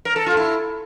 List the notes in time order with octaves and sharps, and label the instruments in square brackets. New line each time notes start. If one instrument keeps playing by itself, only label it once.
[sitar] A#4
A4
F4
E4